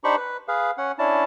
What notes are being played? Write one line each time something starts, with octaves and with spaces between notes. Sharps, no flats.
D4 D#4 G4 C5 B5 C#6
B4
G#4 B4 F5
C#4 F#5
C#4 D4 E4 A5